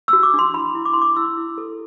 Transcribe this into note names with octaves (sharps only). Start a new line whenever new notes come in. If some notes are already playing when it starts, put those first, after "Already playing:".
F#4 E6
D6
D4
C6
E4 B5
E4
D6
E4 C6
D6
E4 E6
E4
A4